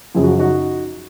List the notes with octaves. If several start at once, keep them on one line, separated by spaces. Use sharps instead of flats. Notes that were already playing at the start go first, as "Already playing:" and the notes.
F#2 C#3 F3 G#4
F#4
F4
D#4 F#4